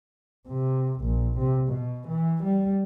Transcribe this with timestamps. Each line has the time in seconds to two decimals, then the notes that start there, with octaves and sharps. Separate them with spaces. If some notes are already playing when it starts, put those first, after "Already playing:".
0.47 C3
1.01 A#1
1.38 C3
1.69 B2
2.08 E3
2.43 G3